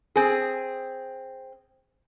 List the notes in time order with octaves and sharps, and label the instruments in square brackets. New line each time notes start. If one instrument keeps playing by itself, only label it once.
[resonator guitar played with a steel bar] C4 G#4